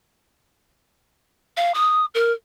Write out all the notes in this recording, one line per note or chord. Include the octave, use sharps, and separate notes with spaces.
F5
D#6
A#4